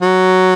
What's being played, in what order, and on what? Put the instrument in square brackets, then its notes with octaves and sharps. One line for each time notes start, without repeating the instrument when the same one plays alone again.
[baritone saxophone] F#3